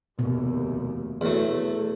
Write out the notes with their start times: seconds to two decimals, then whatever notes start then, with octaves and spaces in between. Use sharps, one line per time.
0.19 F1 D#2 B2
1.21 E2 F#3 A3